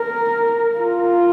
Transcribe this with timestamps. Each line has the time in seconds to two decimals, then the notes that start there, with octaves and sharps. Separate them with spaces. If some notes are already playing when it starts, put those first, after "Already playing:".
Already playing: A#4
0.79 F4